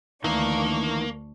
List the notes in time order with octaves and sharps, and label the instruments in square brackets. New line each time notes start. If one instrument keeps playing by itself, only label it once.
[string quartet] D2 D4 C#6 [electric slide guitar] D#3 E3 [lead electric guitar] A#3